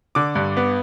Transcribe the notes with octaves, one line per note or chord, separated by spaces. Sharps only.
D3 D6
G2
B3